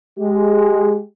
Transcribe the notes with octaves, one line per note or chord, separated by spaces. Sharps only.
G#3 G4